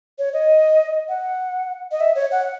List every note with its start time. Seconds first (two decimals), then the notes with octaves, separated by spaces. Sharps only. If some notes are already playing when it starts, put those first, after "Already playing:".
0.19 C#5
0.33 D#5
1.09 F#5
1.92 D#5
2.00 E5
2.15 C#5
2.32 F#5